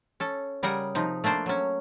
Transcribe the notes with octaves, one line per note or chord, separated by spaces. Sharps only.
C#4 A4
C#3 G3 G#4 A#4 F#5
C3 F3 D#4
A3 A#3 D4 C5
F#3 C#4